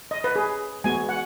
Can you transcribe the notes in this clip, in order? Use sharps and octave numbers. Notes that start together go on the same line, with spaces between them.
D#5
B4
G#4
G#3 B3 F#4 G#5
F#5